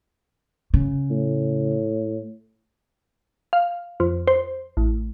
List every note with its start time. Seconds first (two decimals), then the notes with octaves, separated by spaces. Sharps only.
0.74 C#3
1.10 A2
3.53 F5
4.00 F2
4.27 C5
4.77 A1